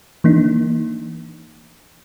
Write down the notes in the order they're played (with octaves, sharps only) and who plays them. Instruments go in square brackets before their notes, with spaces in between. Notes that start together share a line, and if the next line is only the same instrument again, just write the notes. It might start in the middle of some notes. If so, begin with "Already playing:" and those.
[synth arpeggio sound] E3 A#3 D4 D#4